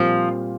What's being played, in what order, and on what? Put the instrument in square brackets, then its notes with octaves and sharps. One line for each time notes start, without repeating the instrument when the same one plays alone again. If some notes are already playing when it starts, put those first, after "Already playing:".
Already playing: [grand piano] A#2 G3 C4 F4 [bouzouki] F3